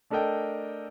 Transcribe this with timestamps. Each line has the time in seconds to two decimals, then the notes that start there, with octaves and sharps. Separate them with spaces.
0.10 A3 D4 A4 A#4 D#5 G5